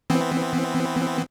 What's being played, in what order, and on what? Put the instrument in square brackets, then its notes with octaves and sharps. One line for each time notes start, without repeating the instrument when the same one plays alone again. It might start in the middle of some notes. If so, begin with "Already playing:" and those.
[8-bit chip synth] E3 B3 C4